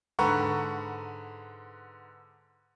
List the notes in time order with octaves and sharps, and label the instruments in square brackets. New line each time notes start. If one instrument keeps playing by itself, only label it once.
[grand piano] G#2 D3 B4 F#5 A#5 C#6